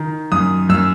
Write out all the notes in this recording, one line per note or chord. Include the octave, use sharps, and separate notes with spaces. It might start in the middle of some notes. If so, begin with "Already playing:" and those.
Already playing: D#3
F#2 D#6
F#2 E6